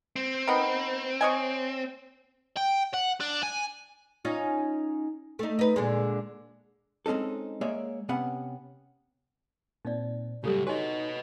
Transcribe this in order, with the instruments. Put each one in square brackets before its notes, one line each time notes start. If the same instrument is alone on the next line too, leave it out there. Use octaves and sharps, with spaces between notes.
[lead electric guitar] C4
[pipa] D#3 B3
C#5 D#5 G#5
[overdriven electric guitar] G5
F#5
D4
G#5
[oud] C#4 D#4 F4
A3 D#4
D#4 B4
A#2 D3 G#3
[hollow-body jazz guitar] G#3 C4 C#4 D#4 A4
G#3 A#3 G#4 C#5 D5 E5
C3 B3 C#4 F#5
[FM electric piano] A#2 C4 [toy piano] D#4 D5
[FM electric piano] A2 G3 [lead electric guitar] C#3 F#3 [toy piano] E4 A4 [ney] G4
[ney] D#4 [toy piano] F#4 G#5 [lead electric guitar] B4 D#5 [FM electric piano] C#5